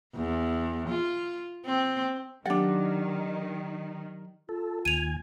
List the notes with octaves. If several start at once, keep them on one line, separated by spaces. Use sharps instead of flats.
E2
F4
C4
D#3 F#3 D4 G4 F#5 A6
F4 A4
D#2 G#5 D#7 F7